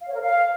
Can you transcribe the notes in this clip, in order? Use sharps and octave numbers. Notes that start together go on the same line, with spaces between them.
F5
C#5
A#4
F5